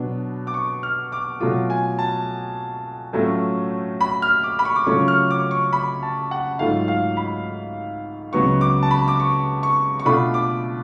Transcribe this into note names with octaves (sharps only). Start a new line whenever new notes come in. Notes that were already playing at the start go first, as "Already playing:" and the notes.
Already playing: B2 F#3 B3 D4
D6
C#6
F6
D6
B2 F#3 A3 F4 D6
G#5
A5
A2 F#3 A3 C#4 F4
B5
F6
D6
B5
C#6
D6
C#3 F#3 A3 C#4 F4 C#6
F6
D6
C#6
B5
A5
F#5
G#2 F#3 A3 F4 F5
F5
B5
C#2 C#3 F#3 B3 C#6
D6
A5
B5
D6
C#6
C#6
C#6
B2 A3 D4 F4 B5
D6